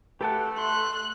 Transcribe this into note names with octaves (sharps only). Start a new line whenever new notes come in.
A3 G4 A4 B4 F#5 G5 A5
C6 F#6